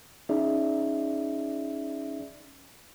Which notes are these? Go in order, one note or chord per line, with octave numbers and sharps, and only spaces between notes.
C#4 D#4 G#4 D5 E5